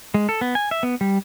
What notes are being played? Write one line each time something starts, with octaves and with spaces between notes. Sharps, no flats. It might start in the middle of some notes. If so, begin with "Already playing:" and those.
G#3
A4
B3
G#5
E5
B3
G3